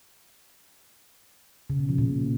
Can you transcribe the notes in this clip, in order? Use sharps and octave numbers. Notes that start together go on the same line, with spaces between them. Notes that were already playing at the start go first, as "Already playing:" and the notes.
C#3
B2
F3
A#2